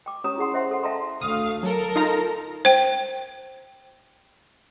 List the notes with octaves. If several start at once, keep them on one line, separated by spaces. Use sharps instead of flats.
G5 D6
C#4 G4 C#5 A#5 D#6
E4 G#4 F#5 C6
C5 E5 F#5 C6
A4 F#5
E5 F5 G5 A5 A#5 C6
D2 A3 F5 D#6
F#3 A4 A#4
D#4 F4 A#5
C5 G5